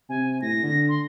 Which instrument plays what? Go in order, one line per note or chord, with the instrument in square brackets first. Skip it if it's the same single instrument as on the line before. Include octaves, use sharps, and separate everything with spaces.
[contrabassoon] C3 [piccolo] G#5
[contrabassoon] A2 [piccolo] A#6
[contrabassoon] D3
[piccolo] C6